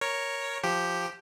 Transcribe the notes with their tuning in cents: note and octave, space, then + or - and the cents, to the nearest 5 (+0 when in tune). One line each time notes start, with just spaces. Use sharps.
A#4 +0 C#5 +0
F3 +0 G4 +0